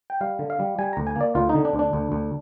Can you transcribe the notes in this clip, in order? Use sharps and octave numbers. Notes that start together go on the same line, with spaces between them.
G5
G3 F5
D3
F5
G3
G3 G#5
D2 A#5
G#5
A#3 D5
D2 F4
D#4
D3
D4
D2
D4
D2
D2